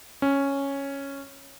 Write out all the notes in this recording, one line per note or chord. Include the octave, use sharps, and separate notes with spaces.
C#4